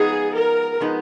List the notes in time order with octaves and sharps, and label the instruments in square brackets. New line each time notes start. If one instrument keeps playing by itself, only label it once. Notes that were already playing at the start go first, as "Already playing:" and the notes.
Already playing: [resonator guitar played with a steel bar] F3 G#3 B3 D#4 [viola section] G#4
[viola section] A#4
[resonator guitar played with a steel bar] F3 G#3 B3 D#4